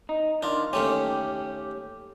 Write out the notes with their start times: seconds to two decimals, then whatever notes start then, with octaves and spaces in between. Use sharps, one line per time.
0.09 D#4
0.43 D#3 D4 F4
0.73 D#2 A3 C#4 G4